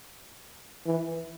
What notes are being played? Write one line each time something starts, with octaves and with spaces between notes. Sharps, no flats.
E3